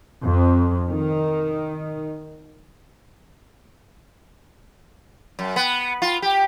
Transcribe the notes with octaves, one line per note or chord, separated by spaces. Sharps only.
F2
D#3
F#2
B3
F4
G4